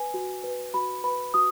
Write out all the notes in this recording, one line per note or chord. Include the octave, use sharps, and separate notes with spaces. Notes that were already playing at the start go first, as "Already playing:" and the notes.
Already playing: B4 G#5
F#4
B4
F#4 B5
B4 B5
F#4 D#6